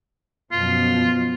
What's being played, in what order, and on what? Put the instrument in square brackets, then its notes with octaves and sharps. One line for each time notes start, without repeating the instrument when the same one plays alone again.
[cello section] F#2 B2 F3 [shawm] F4